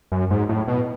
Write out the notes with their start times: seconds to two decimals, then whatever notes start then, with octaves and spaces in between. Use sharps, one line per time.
0.12 F#2
0.31 G#2
0.49 A2
0.68 B2